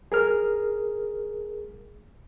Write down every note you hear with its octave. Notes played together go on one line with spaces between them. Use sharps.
G#4 A#4 F6